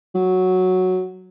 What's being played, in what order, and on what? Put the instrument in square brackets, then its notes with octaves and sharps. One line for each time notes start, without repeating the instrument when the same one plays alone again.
[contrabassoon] F#3